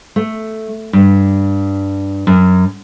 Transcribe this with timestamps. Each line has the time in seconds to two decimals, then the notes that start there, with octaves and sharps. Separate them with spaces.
0.16 A3
0.93 G2
2.27 F#2